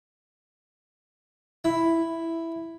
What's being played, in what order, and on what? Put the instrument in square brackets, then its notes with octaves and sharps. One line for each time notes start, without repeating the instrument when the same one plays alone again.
[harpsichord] E4